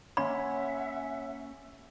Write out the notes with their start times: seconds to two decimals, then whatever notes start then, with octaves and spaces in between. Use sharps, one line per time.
0.17 A#3 C#4 C#5 E5 F#5 G#5 B5 C6